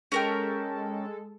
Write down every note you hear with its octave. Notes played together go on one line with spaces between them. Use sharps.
G#3 C#4 A4 A#4 G5